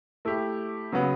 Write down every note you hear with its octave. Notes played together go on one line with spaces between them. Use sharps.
A3 E4 G4
C#3 F#3 B3